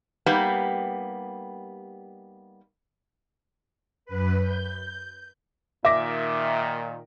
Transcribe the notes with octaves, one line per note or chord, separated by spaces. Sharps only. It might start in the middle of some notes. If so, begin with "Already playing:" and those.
G3 A#3 B3 D#4 G4
F#2 B4
G6
A#2 D#3 E5 D6 A#6